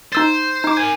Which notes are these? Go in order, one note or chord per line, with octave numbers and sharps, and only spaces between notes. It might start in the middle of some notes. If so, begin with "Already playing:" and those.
D#4 C5 E6 A6
D#4 D6
A#4 G#5 G#6